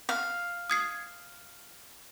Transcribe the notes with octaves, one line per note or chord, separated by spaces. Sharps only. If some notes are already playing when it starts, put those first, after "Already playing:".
F5
D#6 G#6 C7